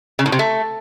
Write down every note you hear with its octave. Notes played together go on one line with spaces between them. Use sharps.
C#3
A2
C3
A3